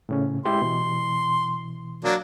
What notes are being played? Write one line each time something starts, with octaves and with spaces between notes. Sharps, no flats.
A2 C#3 C#4
G#3 E4 G4 C6
B2 E3
F#3 A#3 D4